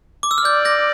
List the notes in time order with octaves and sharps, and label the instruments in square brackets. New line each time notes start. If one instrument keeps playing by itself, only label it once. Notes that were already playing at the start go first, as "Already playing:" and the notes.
[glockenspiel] D6
E6
F6
[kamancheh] D5 [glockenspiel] G6
[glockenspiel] G6 A#6